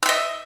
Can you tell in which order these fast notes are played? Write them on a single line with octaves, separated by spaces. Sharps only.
E6 E5 D#5